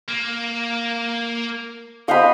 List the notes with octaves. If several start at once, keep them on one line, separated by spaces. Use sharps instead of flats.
A#3
C5 D#5 F5 F#5 B5 C#6